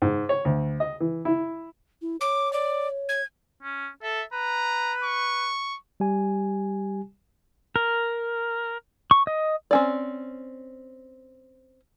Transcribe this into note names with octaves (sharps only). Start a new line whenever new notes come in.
G#2
C#5
D2
D#5
E3
E4
E4
C#5 D6
D5
G#6
C#4
A4 E5
B4 A#5
C#6
G3 G4 G#5
A#4
C#6
D#5
C4 C#4 D5